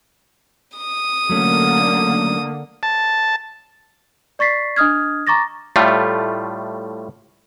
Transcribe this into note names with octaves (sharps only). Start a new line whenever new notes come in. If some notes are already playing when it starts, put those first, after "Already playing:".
D#6
D3 F#3 A3 A#3 C#4
A5
D5 C#6 A6 B6 C7
D4 D#5 D#6 F6 G#6
A#5 C#6 D6 A6 A#6
A2 G3 A3 F4